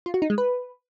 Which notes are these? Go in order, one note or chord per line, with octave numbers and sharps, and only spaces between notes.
F4
F#4
D#4
G#3
B4